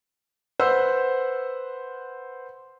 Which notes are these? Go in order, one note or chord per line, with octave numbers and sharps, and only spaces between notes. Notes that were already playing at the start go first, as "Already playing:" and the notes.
B4 C5 F#5 E6